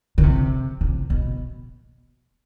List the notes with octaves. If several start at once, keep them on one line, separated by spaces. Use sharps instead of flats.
D3
C3
C3
B2